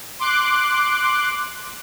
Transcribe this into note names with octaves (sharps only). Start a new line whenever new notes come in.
C6 D6 F#6